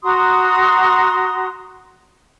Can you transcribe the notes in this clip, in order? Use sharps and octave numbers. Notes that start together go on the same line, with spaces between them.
F#4 A#5 C6 D#6